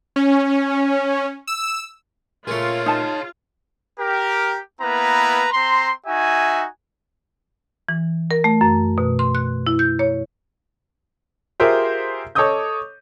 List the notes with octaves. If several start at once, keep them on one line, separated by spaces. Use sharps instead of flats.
C#4
E6
A#2 A3 F4 G#4 C#5
D#4 A5
G4 A#4
A#3 B3 E4 B4 A#5
C4 A#5 C6
D#4 F#4 E5 G#5
E3
A#4
A3
F#2
B2
C6
F#6
E4
G6
C#5
F4 G4 G#4 A#4 C5 E5
A4 C#5 D#5 D6 D#6 G6